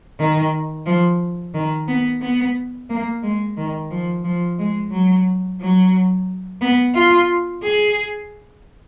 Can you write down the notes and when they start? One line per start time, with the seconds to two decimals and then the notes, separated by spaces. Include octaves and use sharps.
0.19 D#3
0.86 F3
1.54 D#3
1.88 B3
2.21 B3
2.89 A#3
3.23 G#3
3.57 D#3
3.90 F3
4.24 F3
4.59 G#3
4.92 F#3
5.60 F#3
6.61 B3
6.95 F4
7.63 G#4